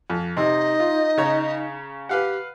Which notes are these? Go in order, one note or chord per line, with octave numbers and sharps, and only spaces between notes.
F2
C3 D#4 D#5
F4
C#3 C#5 A#5
G4 B4 F5 F#5